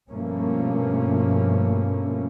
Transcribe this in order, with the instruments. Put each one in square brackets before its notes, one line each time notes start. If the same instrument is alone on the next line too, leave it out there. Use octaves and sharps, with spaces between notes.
[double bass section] G2 B2 F3 A3 A#3 C#4